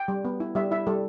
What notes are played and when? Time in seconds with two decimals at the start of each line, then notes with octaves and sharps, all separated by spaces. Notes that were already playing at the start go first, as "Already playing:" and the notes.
Already playing: G5
0.08 G3
0.25 B3
0.40 E4
0.55 G3 E5
0.71 E4 E5
0.87 G3 A4